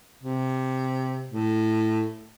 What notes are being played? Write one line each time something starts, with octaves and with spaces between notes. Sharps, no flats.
C3
A2